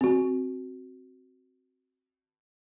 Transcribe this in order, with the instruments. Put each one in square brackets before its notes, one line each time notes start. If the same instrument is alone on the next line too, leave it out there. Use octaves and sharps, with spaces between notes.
[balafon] C4 F#4